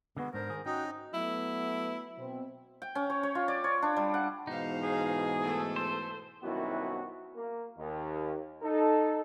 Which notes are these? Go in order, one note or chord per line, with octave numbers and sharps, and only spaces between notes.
D3 G#3 B3 F#4
G#2 D4 A#4 C5
D#3 G#4
C#4 D#4 F#4 G5
F#3 A3 B3 E4
B2 C4
G5
C#4
C#5
C#5
F4
D5
C#5
D4
G3
F#5
G#2 B2 E3 D#4 C5 F5
G#4
A3 A4
C5
C2 F#2 D#3 B3 E4 F#4
A#3
D#2
D#4 A4